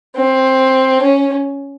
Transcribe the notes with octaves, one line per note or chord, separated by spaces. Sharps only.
C4
C#4